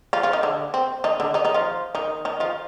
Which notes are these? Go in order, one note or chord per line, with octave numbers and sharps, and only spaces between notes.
F3 F4
F3 F4
D#3 D#4
D3 D4
C4
D#3 D#4
D3 D4
D#3 D#4
D#3 D#4
F3 F4
D#3 D#4
D#3 D#4
F3 F4